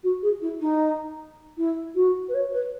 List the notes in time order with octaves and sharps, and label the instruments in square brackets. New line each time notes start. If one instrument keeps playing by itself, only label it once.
[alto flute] F#4
G#4
E4
D#4
E4
F#4
B4
C#5
B4